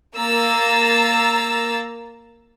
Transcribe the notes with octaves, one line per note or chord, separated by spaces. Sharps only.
A#3 A#5 E6 A6